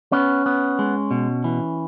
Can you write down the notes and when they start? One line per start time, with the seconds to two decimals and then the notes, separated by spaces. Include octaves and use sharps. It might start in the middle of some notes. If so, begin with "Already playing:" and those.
0.12 B3 C#4
0.46 B3
0.79 G#3
1.11 B2
1.44 E3